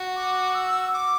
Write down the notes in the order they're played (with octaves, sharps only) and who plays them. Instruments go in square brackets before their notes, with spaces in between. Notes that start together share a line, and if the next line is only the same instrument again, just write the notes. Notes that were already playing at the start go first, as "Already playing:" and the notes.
Already playing: [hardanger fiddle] F#4
[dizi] D6
E6
D6